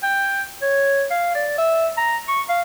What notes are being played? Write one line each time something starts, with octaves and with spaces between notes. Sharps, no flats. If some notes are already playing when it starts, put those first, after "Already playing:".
G5
C#5
F5
D5
E5
A#5
C#6
F5